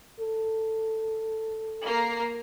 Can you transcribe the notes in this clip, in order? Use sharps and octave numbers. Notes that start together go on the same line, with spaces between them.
A4
A#3 A#5 C7